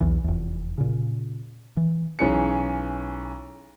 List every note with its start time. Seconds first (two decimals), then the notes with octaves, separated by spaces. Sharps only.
0.01 B1 E2 E3
0.24 F1 E2
0.78 A#2 C#3
1.77 E3
2.19 B1 E3 C#4 G#4 C#7